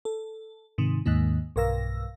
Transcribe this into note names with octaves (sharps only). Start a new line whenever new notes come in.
A4
G#2 C3 D#3
D#2 G#2 D#3 A#3
B1 G2 A#4 F5 E6 A#6